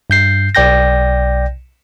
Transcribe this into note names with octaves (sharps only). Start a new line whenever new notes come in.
G2 G6 C7
B1 D5 G5 G6 A#6